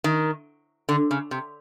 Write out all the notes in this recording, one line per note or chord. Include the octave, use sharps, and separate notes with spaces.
D#3
D3
C#3
C3